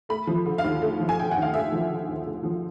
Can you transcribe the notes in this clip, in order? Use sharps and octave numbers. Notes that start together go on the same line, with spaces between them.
A3 B5
F3
D3
F5
D#2
A3
F3
G#5
D3 G5
D#2 F#5
F5
A3 E5
F3
D3
D#2
A3
F3